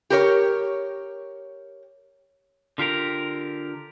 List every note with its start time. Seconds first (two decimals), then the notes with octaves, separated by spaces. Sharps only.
0.10 G4 A#4 C#5
2.78 D3 F4 G4 A#4